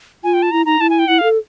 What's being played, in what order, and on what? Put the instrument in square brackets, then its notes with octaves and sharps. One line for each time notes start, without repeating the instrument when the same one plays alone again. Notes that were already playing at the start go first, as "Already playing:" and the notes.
[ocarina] F4 [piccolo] G#5
[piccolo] G5
A5
[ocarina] E4 [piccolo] A#5
[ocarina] D#4 [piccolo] A#5
[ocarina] E4 [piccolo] A5
[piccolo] G#5
G5
[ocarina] E4 [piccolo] F#5
[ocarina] A4 [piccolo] F5